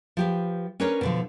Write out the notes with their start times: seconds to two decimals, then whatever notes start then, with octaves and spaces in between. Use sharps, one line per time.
0.17 F3 G4 B4
0.80 C#4 D4 A#4 B4 C#5
1.01 B2 D3 F3